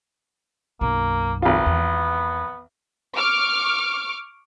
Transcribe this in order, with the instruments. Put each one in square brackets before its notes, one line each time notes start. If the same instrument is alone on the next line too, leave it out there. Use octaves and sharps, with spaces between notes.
[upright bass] B1 F#2 [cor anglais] A#3
[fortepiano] G#1 F4 [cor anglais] B3
[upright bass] E2
[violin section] C#6 D6 F6